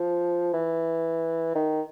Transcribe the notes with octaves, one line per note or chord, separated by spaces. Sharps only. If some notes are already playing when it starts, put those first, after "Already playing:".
Already playing: F3
E3
D#3